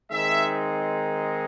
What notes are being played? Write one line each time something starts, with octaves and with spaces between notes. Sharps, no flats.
D#3 G#3 C4 D#4 E5